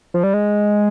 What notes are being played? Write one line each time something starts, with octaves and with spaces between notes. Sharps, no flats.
F3
G3
G#3